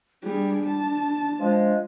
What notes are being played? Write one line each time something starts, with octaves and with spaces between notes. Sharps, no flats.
G3 D4 G#4
A5
F3 G#3